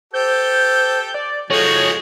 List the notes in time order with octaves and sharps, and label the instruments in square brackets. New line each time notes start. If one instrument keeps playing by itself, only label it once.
[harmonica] G4 A4 [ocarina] C5 [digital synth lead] G6
[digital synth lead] D5
[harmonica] F3 G#3 [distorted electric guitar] F#4 G#4 [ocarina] A4 [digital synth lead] C#5